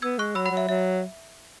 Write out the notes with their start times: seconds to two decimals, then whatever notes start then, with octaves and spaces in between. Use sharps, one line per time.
0.02 B3 E6 G#6
0.18 G#3 C#6 F#6
0.35 F#3 B5 E6
0.46 F#5 B5
0.51 F#3
0.57 E5
0.68 F#3 E5